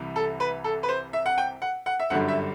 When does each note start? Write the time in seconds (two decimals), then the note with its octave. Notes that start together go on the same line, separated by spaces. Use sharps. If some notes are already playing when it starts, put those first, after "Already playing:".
Already playing: C2 C3 E3 G3
0.16 A4
0.40 B4
0.64 A4
0.83 B4
0.89 C5
1.13 E5
1.26 F#5
1.38 G5
1.62 F#5
1.86 F#5
2.00 E5
2.10 G1 F#2 D3 G3 F#5
2.28 E5